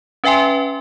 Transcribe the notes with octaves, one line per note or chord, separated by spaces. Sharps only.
C#4 B4 E5 G5 G#5 C6